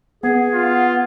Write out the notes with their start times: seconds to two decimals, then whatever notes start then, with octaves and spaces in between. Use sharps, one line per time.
0.23 B3 G#4 F#5
0.54 F4